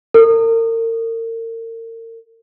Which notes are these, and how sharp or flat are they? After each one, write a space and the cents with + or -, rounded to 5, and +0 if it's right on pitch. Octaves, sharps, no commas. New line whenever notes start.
A#4 -40